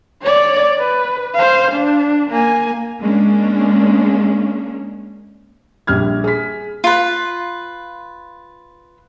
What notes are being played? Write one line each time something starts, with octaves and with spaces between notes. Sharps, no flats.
C#5 D5
B4
C5 F5
D4
A#3 G#5
G#3 A#3 C#4 D4
A#1 G3 F6 G#6
G#4 B6
F4 B4